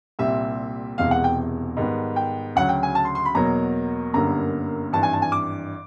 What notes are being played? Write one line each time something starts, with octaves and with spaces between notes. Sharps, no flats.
C2 A#2 G3 C4 E5
E1 E2 C3 E3 G#3 F5
F#5
G5
G#2 D#3 G3 B3
G5
D2 C#3 F#3 F#5
G5
G#5
A5
C6
C6
B5
E2 B2 F#3 A#3 A#5
G1 F#2 D3 G3 A#3 A#5
G#1 G2 E3 A5
G#5
A5
G#5
D6